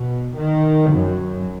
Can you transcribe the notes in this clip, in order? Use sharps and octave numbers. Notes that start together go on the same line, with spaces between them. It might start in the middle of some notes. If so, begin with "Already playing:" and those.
Already playing: B2
D#3
F#2